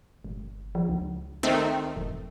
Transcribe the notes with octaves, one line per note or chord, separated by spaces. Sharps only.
G1
F3
C#2
D#3 A3 C4
E1